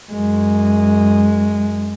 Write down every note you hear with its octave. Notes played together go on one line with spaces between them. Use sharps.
F#2 G#3